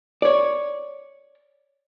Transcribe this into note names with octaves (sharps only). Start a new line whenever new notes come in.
C#5 D5